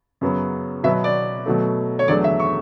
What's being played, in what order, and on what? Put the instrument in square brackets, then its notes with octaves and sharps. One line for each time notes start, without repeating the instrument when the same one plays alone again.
[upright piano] F#2 C#3 F#3 B3
B2 F#3 B3 E5
D5
B2 F#3 A3
C#5
E2 D3 F#3 A3 D5
E5
C#6